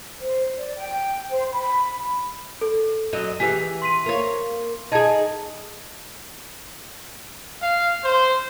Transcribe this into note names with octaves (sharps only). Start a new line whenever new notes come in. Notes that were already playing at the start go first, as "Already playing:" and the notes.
C5
D5
G5
C5
B5
A4
F#2 F#3 D#5
E3 G4 G#4 B6
C6 B6 D#7
A#3 C#5
D#4 G#4 D#5 A5 G#6
F5
C5